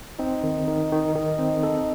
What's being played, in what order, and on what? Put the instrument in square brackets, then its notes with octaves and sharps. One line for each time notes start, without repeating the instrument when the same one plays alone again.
[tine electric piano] C4 [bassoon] D#4
[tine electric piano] D#3
D#3
D#3
D#3
C4
A4